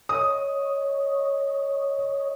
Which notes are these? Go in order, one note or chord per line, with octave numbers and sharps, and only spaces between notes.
C#5 D#5 D#6